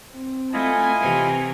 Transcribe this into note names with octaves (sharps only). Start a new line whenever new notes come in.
C4
A3 E4 F4 D#5 G#5
C3 E3